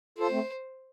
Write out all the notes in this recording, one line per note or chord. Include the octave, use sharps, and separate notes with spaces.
F4 A4 C5
A3 C4